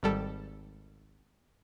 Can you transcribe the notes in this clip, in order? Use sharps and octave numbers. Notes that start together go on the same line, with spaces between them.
G#1 G3 A4